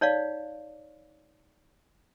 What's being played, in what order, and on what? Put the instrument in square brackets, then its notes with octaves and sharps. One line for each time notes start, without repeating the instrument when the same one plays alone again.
[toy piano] D#4 C#5 D5 F5